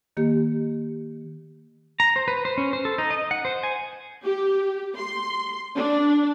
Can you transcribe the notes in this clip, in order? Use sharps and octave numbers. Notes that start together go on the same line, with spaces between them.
D#3 A#3 G4
A#5
C5
B4
C5
C#4
C5
A4
D#4
D#5
F#5
C5
G#5
G4
C6
D4